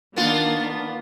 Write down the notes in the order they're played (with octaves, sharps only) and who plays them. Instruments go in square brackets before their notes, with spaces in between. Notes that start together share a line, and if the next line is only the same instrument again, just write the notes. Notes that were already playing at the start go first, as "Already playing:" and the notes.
[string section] D#3 A#3 D4 [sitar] B3 F4